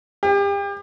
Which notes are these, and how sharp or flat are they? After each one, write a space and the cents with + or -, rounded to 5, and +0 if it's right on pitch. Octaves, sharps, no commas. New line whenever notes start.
G4 +35